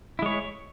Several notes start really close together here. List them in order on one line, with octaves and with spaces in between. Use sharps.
E4 G#3 C#5